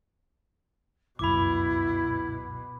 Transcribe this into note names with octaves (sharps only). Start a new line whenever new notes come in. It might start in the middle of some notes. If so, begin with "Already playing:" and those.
G1 C#2 F#2 B2 E4 B5 D6